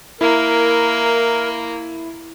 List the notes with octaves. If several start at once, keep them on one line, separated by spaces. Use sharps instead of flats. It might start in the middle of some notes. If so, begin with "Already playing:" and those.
A#3 E4 A#4